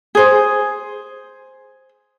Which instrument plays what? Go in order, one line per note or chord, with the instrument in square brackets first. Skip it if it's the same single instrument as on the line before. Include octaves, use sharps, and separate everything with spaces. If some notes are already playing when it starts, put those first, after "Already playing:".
[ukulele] G#4 C5